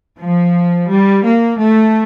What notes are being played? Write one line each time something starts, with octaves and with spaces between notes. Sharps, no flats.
F3
G3
A#3
A3